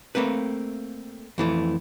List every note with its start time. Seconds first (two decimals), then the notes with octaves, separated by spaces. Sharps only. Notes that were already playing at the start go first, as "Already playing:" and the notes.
0.15 A3 A#3 C4 B4
1.38 F2 E3 A3